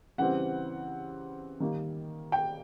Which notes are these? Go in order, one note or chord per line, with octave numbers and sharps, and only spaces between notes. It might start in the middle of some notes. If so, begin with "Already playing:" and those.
C#3 E3 G3 C4 F#5
D#3 G3 A#3
G5